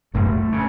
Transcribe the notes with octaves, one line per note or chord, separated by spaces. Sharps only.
G1 F#2 D3 A3
C#3